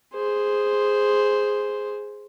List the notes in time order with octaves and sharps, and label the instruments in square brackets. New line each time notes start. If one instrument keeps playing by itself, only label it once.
[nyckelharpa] G#4 C5